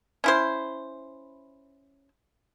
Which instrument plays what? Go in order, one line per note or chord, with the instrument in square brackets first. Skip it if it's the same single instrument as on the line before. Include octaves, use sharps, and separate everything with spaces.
[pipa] C#4 E4 C5